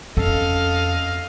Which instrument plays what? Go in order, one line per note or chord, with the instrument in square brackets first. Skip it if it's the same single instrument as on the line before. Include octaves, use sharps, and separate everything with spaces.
[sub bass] F2 [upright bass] C#4 [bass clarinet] A4 [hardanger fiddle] D#5 F5